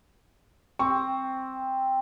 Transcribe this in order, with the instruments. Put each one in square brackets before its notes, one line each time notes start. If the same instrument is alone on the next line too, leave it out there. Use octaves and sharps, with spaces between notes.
[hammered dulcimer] C4 [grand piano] C#6